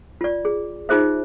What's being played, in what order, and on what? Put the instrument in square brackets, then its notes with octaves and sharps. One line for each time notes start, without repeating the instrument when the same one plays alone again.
[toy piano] F4 D5
G#4
D#4 F4 G#4 C5 E5